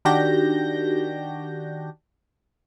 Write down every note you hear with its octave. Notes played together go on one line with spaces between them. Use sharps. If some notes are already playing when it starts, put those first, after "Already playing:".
D#3 D4 F#4 G4 G6 A#6